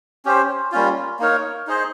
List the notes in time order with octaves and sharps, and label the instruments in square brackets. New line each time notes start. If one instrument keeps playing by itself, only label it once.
[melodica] C#4 G4 C5
G3 A#3 C#4 F4
A#3 D#4 A#4 C#5
D#4 G#4 C5 D#5